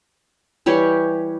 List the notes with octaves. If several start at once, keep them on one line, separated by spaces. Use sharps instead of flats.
E3 G3 G4 C#5